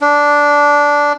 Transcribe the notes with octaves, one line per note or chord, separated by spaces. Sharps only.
D4